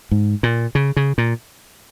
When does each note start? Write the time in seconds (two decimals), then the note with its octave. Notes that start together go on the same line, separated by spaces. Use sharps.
0.11 G#2
0.43 A#2
0.75 C#3
0.97 C#3
1.18 A#2